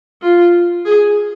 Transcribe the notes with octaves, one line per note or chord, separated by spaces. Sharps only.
F4
G#4